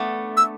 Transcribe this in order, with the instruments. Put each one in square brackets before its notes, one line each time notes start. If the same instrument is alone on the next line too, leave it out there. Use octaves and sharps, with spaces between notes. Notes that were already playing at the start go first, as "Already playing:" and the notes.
Already playing: [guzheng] A3 B3 D4
[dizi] E6